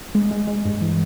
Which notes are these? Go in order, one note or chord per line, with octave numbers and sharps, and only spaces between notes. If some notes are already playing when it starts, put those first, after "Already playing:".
G#3
G#3
G#3
G2
E3